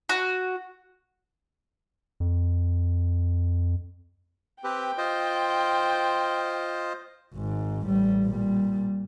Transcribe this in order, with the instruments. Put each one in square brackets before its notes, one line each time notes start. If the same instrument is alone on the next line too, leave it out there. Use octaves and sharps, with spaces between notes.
[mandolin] F#4
[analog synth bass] F2
[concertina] C4 G4 B4 [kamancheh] G5
[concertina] F4 C5 D#5
[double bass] G#1 G#2
A1 G3
A#2 G3